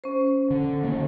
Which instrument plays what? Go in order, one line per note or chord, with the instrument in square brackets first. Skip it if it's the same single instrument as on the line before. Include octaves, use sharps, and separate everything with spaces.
[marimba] C#4 C5
[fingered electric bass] D3
D3 D#3 A#3